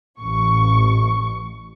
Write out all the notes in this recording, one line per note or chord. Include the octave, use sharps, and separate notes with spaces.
A1 C#6